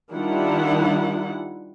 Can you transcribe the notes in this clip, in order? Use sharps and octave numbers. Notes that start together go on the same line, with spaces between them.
D#3 G3 D4 E4 F4 F#5